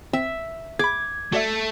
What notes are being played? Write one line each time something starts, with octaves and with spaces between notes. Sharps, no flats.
C4 E5
G#4 B5 D6 G#6
A3 F#4 D5 E5